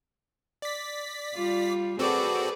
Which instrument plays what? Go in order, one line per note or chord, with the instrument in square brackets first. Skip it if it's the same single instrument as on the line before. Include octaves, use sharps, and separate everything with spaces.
[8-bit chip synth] D5 B6
[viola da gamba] G3 F4
[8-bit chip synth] C4 F#4 A4 [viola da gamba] G#4 B4 D5